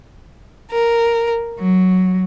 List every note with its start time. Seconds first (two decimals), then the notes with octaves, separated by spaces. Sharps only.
0.70 A#4
1.59 F#3